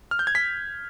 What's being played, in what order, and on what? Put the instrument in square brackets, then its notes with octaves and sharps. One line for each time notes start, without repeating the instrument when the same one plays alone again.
[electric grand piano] F6
G6
G#6
B6